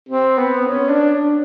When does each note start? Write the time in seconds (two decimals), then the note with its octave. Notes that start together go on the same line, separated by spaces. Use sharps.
0.09 C4
0.38 B3
0.67 C#4
0.89 D4